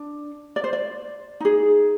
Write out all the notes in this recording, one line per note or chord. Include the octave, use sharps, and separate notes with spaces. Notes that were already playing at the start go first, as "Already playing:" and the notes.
Already playing: D4
D5
C5
D5
D#4 G#4